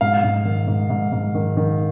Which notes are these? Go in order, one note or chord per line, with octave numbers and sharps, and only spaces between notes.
G#2 F5
G#2
D#3
G#2
G#2
G#2
D#3
D#3